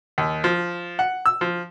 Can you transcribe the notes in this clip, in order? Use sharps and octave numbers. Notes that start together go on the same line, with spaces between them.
D#2
F3
F#5
E6
F3